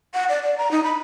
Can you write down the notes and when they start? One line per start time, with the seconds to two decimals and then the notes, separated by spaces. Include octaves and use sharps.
0.14 F#5
0.29 D5
0.43 D5
0.58 A#5
0.71 D#4
0.84 B5